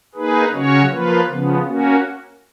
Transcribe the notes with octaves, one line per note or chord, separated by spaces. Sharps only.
A#3 D#4 G#4 B4
C#3 F#3 C#4 F#4 C#5
F3 A#3 F4 B4
C#3 F3 B3
A#3 C#4 F#4